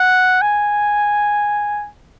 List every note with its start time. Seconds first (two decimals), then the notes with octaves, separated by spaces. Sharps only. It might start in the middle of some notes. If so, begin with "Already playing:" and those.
Already playing: F#5
0.41 G#5